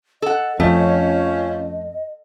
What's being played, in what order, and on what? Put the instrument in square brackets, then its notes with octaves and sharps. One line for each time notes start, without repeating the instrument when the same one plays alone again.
[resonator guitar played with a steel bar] A4 F#5 [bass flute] D#5
[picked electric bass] F2 [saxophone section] F3 C#4 [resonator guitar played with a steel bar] A3